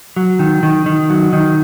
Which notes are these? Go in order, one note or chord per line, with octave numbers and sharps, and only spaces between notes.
F#3
D#3
D#3
D#3
F#3
D#3